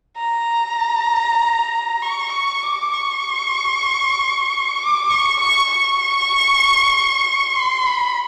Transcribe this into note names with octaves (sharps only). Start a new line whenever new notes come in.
A#5
C#6
C#6
D6
C#6
D6
C#6
C#6
C#6
C6
B5